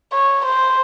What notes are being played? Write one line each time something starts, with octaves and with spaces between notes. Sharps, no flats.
C#5
C5